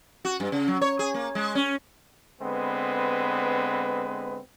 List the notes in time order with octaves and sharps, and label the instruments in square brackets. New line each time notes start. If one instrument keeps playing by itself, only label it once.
[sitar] F#4
G2
C#3
F#3
C#5
G#4
A#3
G#3
C#4
[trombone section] D3 G#3 B3 C4 B4